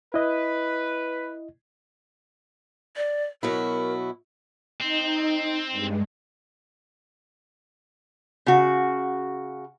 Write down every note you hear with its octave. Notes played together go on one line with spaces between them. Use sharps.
E4 B4 D#5
D5
B2 F#3 E4 A#4
C4 D#4
G2 G#3
C#3 F#4